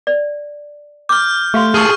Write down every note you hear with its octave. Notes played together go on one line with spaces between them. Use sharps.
D5
D6 F6 G6
A3 G4 F5 C6
G#4 A4 A5 C#6 D#6 F6